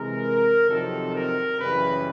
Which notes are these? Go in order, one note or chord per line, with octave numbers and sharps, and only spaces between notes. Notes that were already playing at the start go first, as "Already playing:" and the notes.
Already playing: C3 E3 G#3 A#4
F2 C3 D#3 F#3 A4
A#4
F#2 C#3 E3 G3 B4